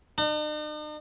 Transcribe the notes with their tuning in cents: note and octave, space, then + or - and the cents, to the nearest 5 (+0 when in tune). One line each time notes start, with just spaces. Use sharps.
D#4 -45